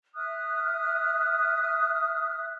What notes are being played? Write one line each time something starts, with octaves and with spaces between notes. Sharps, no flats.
E5 D#6 F6 F#6